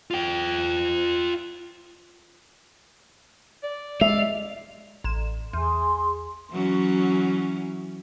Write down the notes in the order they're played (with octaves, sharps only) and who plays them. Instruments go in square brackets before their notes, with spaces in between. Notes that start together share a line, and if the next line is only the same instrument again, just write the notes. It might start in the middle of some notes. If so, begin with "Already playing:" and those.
[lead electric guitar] F4 G5
[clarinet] D5
[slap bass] G#3 [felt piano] E5 [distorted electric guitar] F5
[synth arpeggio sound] A1 E7
[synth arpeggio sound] E2 [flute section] G#4 C6
[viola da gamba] E3 F#3 C#4